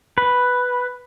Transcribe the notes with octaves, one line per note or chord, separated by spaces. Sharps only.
B4